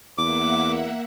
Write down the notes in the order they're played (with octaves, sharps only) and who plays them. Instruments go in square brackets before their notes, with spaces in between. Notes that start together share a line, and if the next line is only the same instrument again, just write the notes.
[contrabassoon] E2 [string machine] A#3 E5 F#5 [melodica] D6